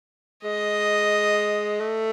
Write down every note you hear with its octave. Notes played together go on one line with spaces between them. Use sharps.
G#3 D#5
A3